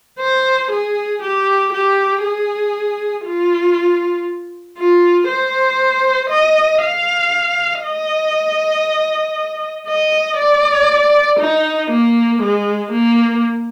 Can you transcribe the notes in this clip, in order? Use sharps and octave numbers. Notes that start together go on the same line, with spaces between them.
C5
G#4
G4
G4
G#4
F4
F4
C5
D#5
F5
D#5
D#5
D5
D#4
A#3
G#3
A#3